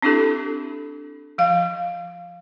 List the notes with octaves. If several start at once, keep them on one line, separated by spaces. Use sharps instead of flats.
C4 D4 E4 G4 A4
F3 F5